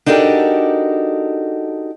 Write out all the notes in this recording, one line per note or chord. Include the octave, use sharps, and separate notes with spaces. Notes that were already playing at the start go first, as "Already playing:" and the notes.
D4 D#4 F#4 G4 A4 A#4